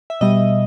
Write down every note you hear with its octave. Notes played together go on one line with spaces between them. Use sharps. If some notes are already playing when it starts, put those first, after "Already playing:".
E5
B2 G3 D#5